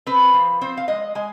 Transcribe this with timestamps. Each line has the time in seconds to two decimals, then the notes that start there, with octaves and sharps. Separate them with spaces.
0.06 C4 B4
0.34 F3
0.61 C4 C5
0.77 F5
0.88 G#3 D#5
1.15 G#3 G#5